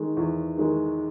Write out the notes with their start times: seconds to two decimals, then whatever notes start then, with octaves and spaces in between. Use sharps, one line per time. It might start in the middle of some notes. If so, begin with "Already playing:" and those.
Already playing: D#3 G#3
0.17 E2
0.57 D#3 G#3